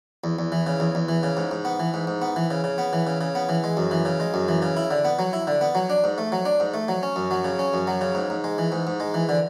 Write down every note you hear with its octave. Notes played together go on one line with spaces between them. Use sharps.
E2
E2
E3
C#3
E2
E2
E3
C#3
G#2
G#2
B3
E3
G#2
G#2
B3
E3
C#3
C#3
B3
E3
C#3
C#3
B3
E3
G#3
F#2
E3
C#3
G#3
F#2
E3
C#3
E4
D3
B3
F#3
E4
D3
B3
F#3
D4
G#2
A3
F#3
D4
G#2
A3
F#3
C#4
F#2
F#3
C#3
C#4
F#2
F#3
C#3
G#2
G#2
G#3
E3
G#2
G#2
G#3
E3
D3